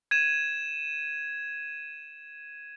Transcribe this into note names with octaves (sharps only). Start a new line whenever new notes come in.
G#6 D#7 E7